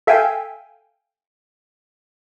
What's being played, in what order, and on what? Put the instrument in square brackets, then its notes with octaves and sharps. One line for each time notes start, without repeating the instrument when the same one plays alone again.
[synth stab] A4 E5 F5 G5 G#5